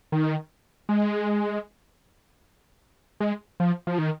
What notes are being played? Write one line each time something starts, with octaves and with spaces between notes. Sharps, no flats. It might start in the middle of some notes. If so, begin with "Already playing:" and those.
D#3
G#3
G#3
F3
F3
D#3